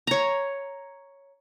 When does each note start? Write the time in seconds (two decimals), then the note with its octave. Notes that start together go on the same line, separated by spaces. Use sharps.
0.07 C#5 A#5